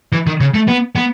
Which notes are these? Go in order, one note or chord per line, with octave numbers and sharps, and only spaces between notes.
E3
D#3
C#3
A3
B3
B3